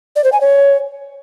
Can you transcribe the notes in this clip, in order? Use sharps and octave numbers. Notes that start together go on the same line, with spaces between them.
D5
C5
G#5
C#5